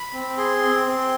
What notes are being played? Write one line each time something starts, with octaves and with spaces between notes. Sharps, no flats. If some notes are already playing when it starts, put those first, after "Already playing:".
Already playing: B5
C4
G#4 C6
C4
C4